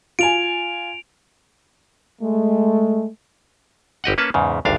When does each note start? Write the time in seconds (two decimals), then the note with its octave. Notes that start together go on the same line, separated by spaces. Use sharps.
0.19 F4 G#5 D7 F7
2.21 G#3 A3
4.04 G1 G4 D#5 F#5
4.18 A#3 C#4 B4 C#5 A5
4.34 E2 G#2 C#3
4.65 G#1 D2 G2 D4 F5